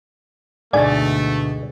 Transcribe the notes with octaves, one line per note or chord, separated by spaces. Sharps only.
D2 G#2 B2 A3 D5 G#5 A6